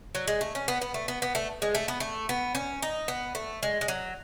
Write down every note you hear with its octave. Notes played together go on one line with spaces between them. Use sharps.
F#3
G#3
A3
C#4
B3
B3
A3
B3
B3
A3
G#3
A3
B3
A3
B3
C#4
D#4
B3
A3
G#3
G#3
F#3